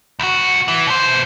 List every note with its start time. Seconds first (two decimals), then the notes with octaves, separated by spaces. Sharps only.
0.19 C2 F#4
0.68 E3
0.87 B2 C5